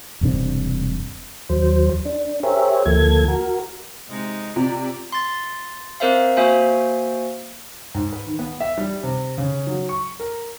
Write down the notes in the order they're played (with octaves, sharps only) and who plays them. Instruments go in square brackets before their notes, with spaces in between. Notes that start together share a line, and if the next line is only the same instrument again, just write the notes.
[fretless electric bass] E1 G2 C3 D4
[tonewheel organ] D#2 F#3 C5
D4
G4 G#4 A#4 C5 C#5 E5
D2 F3 A#3 A4 G#6
F#4 A#4
[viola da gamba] C3 G#3 D#4
[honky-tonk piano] C3 [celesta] F4 [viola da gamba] G4 D5
[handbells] C6 A6
C4 A#4 C5 E5 F5
A#3 F#4 C5 E5 F5 G#5
[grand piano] G#2
B4
D#3
B3
E5
G3
C3
C#3
F#3
C#6
A#4